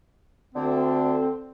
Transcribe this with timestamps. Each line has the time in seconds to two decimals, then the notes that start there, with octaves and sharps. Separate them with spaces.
0.55 D2 D3 C4